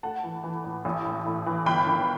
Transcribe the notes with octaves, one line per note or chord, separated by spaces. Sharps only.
A3 F#5 A5
E3
E3
A2
A1
A2
A2
E3
G1 G5 B5
D#3